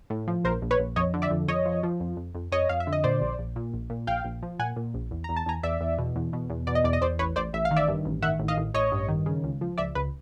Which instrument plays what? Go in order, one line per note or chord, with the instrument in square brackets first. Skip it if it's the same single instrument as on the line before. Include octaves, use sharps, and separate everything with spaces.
[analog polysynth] A2
F3
A#1 A#4 C5
A#1
B4 C#5
A#1
F2 C#5 D#5
D3
D5 E5
F2
F2 C#5 D#5
F3
F3
F2
F2
F2
F2 C#5 D#5
F2 F5
E5
D3
D#5
A#2 C5 D5
A#1
A#1
A#2
A#1
A#2
A#1 F5 G5
A#1
F3
A#2 F#5 G#5
A#2
A#1
E2
E2 A#5
A5
E2 G#5 A#5
E2 D5 E5
E2
B2
E2
B2
E2
B2 D5
D#5
E2 D5
D#5
E2 C5 D5
A1 B4 C#5
A1 C5 D5
A1 E5
F5
D#3
D5 E5
G2
A1
D#3 E5 F#5
A1
D#5 F5
A1
A1 C#5 D#5
G2
D#3
C#3
C#2
F3
C#2 D5 E5
C#2 B4